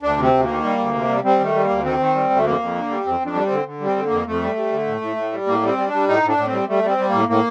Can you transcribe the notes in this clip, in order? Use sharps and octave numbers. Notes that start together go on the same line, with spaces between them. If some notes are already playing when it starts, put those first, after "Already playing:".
D2 D4
C3
C4
D2
D#3 A#3
G3
D2
C3
G3
G3 C4
D#3 A3
G3
A#3
D2
D#3 C4
D#3
G3
D2
A3
F2 A#3
F2
D3
G3
F2 C4
F2
D4
G3
C4
D3
D3
G3
C4
D3
A#3
F2
F2 A3
G3
G3
D3
A2
A2
A2
G3
A2 A#3
G3
C4
G3
D4
G3
A2 D#4
A2
D4
A2
C4
G3
G3 A3
G3 C4
G3
A2 A#3
A2 A#3